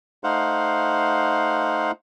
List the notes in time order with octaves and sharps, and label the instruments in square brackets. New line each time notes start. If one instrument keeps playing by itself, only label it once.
[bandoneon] A3 D#4 C5 F5 F#5